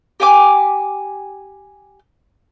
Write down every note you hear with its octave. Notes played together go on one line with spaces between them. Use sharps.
G4 G5 G#5 D6